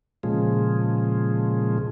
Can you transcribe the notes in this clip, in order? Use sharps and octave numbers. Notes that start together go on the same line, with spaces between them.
A#2 C#3 F3 G#3